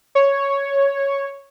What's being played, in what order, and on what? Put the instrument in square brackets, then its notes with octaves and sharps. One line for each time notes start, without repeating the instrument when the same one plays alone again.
[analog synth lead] C#5